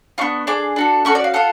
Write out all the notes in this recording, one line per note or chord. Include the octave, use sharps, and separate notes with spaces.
B3 D4 F4 C#6
D4 G#4 D6
D4 F#4 A4
C#4 F#4 A4 C#6
D5
F5
F4 A4 F#5